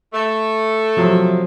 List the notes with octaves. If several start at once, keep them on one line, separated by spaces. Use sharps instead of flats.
A3
C3 F3 F#3